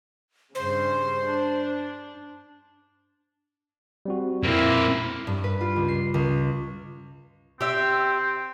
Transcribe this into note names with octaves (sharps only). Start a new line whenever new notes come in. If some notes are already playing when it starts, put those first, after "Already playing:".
G2 C#3 C5
D4
G3 C4 F#4
F2 A#2 A#3 C4 E4 B6
G2
B4
F4
C#2
C7
C#2
C4 G4 E5